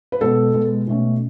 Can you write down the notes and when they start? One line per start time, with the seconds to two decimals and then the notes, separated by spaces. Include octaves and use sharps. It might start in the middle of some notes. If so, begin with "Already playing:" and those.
0.12 B4
0.21 B2 G#3 B3 A4
0.54 B2 G#3 B3
0.87 B2 A3 C#4